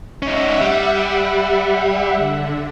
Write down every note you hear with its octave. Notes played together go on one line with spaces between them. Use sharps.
C#4 D#4 E5 F#5
G3
D3